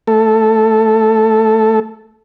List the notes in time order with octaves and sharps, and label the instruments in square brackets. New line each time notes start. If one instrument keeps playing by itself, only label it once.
[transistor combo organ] A3 A4